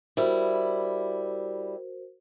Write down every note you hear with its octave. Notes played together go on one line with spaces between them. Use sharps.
G3 E4 F#4 A#4 C5